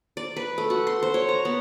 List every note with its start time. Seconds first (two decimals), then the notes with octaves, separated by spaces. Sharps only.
0.17 D5
0.37 B4
0.58 A3
0.70 F#4
0.87 C6
1.03 C5
1.14 C#5
1.29 A#5
1.45 B3